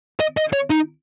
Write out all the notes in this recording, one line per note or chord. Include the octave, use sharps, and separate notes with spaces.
D#5
D#5
C#5
D#4